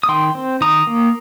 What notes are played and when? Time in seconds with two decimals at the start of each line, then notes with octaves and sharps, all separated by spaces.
0.03 D#6
0.09 D#3 G5 C6
0.35 C4
0.61 D#3 A#5 D#6
0.87 A#3